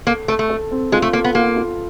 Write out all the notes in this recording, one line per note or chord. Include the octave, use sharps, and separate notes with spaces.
A#3 A4
A3 A4
A3
A4
C4
G#3 F4
A3
A#3 A4
B3
A#3 F4
F4